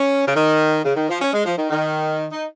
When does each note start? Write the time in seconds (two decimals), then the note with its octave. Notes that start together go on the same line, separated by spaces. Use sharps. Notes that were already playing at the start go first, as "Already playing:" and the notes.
Already playing: C#4
0.27 C#3
0.36 D#3
0.85 C#3
0.96 D#3
1.09 F3
1.22 C#4
1.33 G#3
1.45 F3
1.57 D#3
1.70 D#3
2.32 D#4